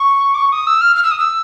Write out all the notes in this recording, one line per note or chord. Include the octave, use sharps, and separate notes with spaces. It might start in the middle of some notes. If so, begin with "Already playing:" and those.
Already playing: C#6
D6
C#6
D#6
E6
F6
F6
E6
D#6
E6